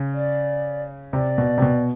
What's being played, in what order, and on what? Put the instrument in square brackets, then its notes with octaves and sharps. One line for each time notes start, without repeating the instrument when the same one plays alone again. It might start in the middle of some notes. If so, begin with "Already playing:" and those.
Already playing: [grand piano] C#3
[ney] D5
[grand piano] C3 [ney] D5
[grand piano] B2
C3
B2